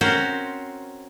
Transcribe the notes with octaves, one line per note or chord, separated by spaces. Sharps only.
C4 C#4 F#4 A#4 C5